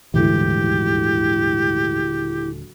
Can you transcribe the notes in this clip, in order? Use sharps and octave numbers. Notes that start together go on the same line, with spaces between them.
D#1 D2 G#2 E3 E4 G4 A4